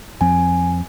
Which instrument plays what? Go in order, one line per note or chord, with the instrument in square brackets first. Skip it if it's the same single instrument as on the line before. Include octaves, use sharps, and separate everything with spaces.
[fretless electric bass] F2 F3 C4 [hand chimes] G#5